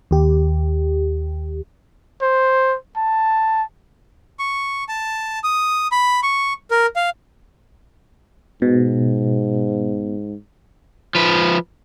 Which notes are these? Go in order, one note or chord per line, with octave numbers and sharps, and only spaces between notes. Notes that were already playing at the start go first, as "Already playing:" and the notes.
D#2 G4
C5
A5
C#6
A5
D#6
B5
C#6
A#4
F5
G#2 B2
F3 B4